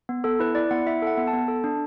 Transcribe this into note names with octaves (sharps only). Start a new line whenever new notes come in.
B3
B3 A4
E4 B4
E4 D5
B3 F#5
E4 E5
A4 F#5
B3
A5
B3
A4
D4